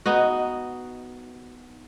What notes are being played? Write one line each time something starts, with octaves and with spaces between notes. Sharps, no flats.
B3 D#4 F#4